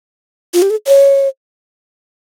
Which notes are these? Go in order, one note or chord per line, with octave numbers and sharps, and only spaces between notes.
F4
G4
A4
C#5